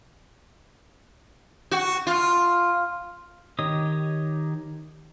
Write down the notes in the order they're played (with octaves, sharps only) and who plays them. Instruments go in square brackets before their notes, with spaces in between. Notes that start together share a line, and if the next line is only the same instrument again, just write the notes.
[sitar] F#4
F4
[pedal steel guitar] D#3 G4 C#5 D#5 D#6